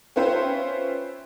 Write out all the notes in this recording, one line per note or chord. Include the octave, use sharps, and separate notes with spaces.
C#4 F4 B4 C5 E5 G5